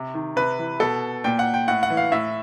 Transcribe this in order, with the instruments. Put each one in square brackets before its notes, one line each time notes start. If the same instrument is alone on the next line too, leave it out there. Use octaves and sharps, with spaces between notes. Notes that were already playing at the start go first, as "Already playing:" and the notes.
Already playing: [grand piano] C3
D#3
C3 B4
E3
B2 A4
A#2 G5
F#5
G5
A2 F#5
F#5
E3
F5
A2 E5